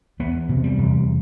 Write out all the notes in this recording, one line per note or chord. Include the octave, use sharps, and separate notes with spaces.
E2 B3
C3
G3
E2